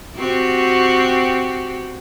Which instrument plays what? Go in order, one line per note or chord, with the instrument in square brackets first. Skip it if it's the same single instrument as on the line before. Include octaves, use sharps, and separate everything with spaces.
[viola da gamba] C4 F#4 G4